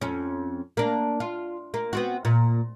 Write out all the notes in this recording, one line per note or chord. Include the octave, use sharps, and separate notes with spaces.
F2 C#4
A#3 D4
F4
A#3
B3 C4 F#4
A#2